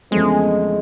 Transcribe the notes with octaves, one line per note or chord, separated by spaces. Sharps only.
E2 C#3 F3 G#3 A3 C4